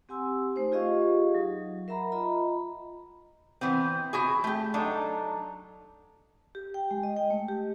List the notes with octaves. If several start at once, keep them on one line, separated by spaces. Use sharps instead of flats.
C4 G4 F#5 G#5 C6 E6
A3 D#4 C5
F4 G4 G#4 D#5 F5 C#6
F#3 D#4
A#4 E5 F#5 A#5 B5
F4 D#5 A#5 B5
E3 B3 C4
E4 F#4 G#4
A3 G4
F#3 D4 D#4 A4
G4
G5
G#3
D#5
G5
A3
G4